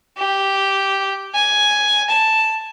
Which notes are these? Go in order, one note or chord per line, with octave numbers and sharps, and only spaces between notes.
G4
G#5
A5